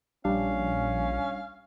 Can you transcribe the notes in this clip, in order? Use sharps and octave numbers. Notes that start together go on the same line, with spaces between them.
A#1 G3 C#4 D4 F5